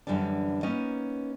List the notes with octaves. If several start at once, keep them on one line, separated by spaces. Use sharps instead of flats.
F#2 D3 E3 G3 D4
A#3 B3 C#4 D#4 D#5